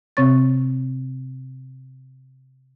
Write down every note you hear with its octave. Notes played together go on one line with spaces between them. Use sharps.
C3 C4 C#5 C#6 A6